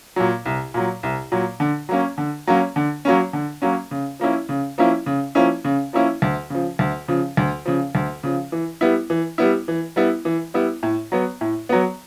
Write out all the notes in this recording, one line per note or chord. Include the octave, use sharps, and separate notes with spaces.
A#2 F#3
C2
A#2 F#3
C2
A#2 F#3
D3
F#3 A#3 C#4
D3
F#3 A#3 C#4
D3
F#3 A#3 C#4
D3
F#3 A#3 C#4
C#3
F3 A#3 C#4 E4
C#3
F3 A#3 C#4 E4
C#3
F3 A#3 C#4 E4
C#3
F3 A#3 C#4 E4
D2
C#3 F3
D2
C#3 F3
D2
C#3 F3
D2
C#3 F3
E3
G3 B3 E4
E3
G3 B3 E4
E3
G3 B3 E4
E3
G3 B3 E4
A2
F#3 B3
A2
F#3 B3